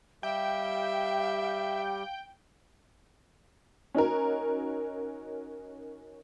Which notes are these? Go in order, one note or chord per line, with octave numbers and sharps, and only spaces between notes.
G3 G4 E5 F5 G5
C#4 D#4 F#4 A#4